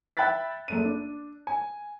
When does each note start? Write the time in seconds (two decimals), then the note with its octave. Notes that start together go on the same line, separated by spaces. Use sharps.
0.17 E5 G5 B5 F#6 A6 B6
0.68 F#1 A3 D#7
0.85 D4
1.47 G#5